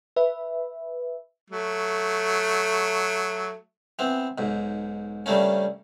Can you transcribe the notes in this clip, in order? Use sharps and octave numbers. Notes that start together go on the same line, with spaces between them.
B4 E5
F#3 A3
E3 B3 C4
B1 G#2
G2 C#3 G3 A3 A#3 C#4